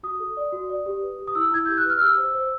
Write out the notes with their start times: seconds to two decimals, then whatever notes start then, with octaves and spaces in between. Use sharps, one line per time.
0.03 F#4 D#6
0.20 A4
0.37 D5
0.52 F#4
0.70 D5
0.86 G4
1.02 B4
1.18 G4
1.27 D#6
1.35 E4 E6
1.52 E4 G#6
1.66 G4 G6
1.77 F#6
1.85 B4
1.90 F6
2.01 G4 E6
2.18 C5
2.34 C5